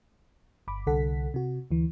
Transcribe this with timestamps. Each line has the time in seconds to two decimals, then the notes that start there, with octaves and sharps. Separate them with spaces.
0.68 G1 B5 D6
0.87 C2 D3 A4 F#5 B6
1.34 C3 F#4
1.71 D2 E3